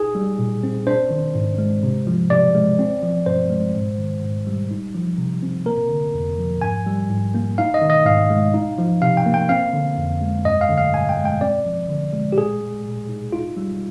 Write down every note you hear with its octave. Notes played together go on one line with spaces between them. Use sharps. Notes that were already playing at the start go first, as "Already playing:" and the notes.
Already playing: D#4 G#4
G3
A#2
C4
D4 C5
D#3
G#2
G#3
C3
F3
C3 D5
G#3
C4
F3
G2 C5
G#3
G#2
D#3
G#2
G3
D#4
F3
C3
C4
A#3 A#4
D3
F2
F3
G#2 G#5
G3
G#2
A#3
D#4 F5
D#5
D#3
D#5
G#2 F5
G#3
D#4
F3
C3 F5
G5
A#3
G5
C4 F5
D3
F2
G#3
G2 D#5
F5
D3
F5
G2 G#5
G5
G#3
G5
C4 D5
F3
D3
G#3
G4
A#2 G#4
G#3
A#2
D#4
D#4 F4
G3